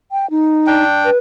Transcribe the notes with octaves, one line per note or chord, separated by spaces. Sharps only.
G5
D#4
D4 G5
B4